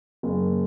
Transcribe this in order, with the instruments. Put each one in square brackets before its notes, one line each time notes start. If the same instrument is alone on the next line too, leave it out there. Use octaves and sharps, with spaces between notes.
[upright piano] F#1